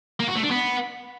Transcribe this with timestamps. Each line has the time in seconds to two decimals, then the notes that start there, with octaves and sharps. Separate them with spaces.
0.20 A#3
0.28 F#4
0.36 A3
0.44 D4
0.52 B3